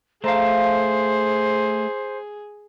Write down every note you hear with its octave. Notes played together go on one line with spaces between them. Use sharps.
A3 G#4 C5 F5 A5 A#5